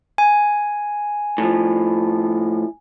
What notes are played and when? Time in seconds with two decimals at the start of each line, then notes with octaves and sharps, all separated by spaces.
0.18 G#5
1.38 A2 F3